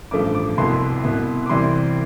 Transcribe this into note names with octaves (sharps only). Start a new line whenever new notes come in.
A1 G2 F3 A3 D6
D6
C2 B2 B3 E4 C6
C2 B2 B3 E4
D6
C2 C3 E3 G3 C6